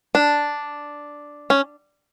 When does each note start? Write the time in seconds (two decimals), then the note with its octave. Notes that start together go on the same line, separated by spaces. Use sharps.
0.15 D4
1.50 C#4